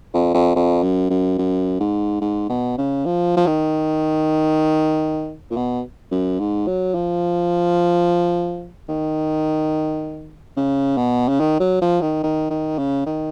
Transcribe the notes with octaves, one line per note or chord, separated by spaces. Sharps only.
F2
F2
F2
F#2
F#2
F#2
G#2
G#2
B2
C#3
F3
F3
D#3
A#2
B2
F#2
G#2
F#3
F3
D#3
C#3
B2
C#3
D#3
F#3
F3
D#3
D#3
D#3
C#3
D#3